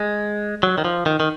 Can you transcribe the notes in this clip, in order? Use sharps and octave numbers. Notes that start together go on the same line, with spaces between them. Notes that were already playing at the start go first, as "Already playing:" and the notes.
Already playing: G#3
F#3
D#3
F3
D#3
D#3